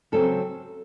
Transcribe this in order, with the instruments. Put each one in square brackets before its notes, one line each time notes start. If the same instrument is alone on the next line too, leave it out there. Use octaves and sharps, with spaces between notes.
[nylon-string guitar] C#3 F#3 C4 A4